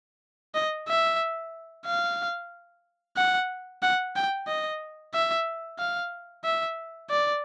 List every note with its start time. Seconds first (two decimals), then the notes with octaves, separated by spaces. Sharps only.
0.55 D#5
0.88 E5
1.86 F5
3.17 F#5
3.83 F#5
4.16 G5
4.47 D#5
5.14 E5
5.79 F5
6.44 E5
7.10 D5